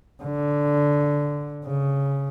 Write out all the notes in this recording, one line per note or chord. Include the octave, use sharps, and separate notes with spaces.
D3
C#3